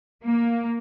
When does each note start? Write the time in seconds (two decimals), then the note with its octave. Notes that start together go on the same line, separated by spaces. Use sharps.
0.24 A#3